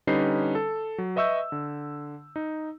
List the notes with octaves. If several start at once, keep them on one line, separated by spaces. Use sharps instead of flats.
D3 G3 C#4 D#4 B4 C7
A4
F#3
B4 D#5 E5 C#6 E6 G6
D3
D#4